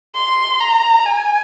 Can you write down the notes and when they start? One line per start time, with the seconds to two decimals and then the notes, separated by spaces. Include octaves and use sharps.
0.15 C6
0.60 A#5
1.06 G#5